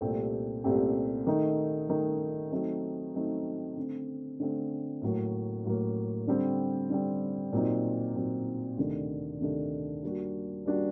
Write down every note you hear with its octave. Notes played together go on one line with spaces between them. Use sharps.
C2 A#2 A3 C4 G4
C2 A#2 A3 C4 G4
D#3 A3 D#4
D#3 A3 D#4
F#3 A3 C4 D#4
F#3 A3 C4 D#4
D3 A3 C4
D3 A3 C4
A2 F#3 A#3
A2 F#3 A#3
D3 G3 C4
D3 G3 C4
A#2 F#3 C4 D#4
A#2 F#3 C4 D#4
D2 C3 D#3 A3 D4
D2 C3 D#3 A3 D4
G3 A#3 D4 F#4
G3 A#3 D4 F#4